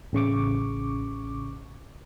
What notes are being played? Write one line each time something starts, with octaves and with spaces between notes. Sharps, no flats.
A1 C#3 C#6 D6